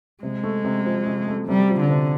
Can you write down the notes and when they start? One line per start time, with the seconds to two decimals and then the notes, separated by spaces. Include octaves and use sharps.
0.23 C3 G#3
0.43 A3
0.64 C3
0.86 F3
1.07 C3
1.28 A3
1.48 C3 G3
1.70 F3
1.80 D3
1.90 C3